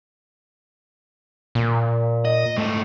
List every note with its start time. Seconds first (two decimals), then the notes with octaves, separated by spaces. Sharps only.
1.55 A#2
2.25 D#5
2.57 G#2 A3